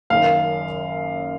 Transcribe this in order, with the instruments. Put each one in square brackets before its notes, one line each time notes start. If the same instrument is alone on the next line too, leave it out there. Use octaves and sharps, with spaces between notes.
[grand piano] F#1 F#2 D#3 F5